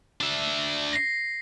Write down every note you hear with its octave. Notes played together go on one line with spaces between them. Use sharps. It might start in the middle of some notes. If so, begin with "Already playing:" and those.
D4 E5
A#6 C7